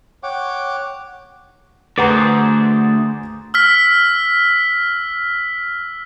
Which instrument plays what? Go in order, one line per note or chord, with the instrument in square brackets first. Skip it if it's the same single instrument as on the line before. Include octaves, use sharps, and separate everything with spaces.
[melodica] C#5 F#5 G5 D6
[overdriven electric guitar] D2 [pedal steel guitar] G#4 C5 D5 [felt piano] B4 F#5 A#5
[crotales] E6 F6 B6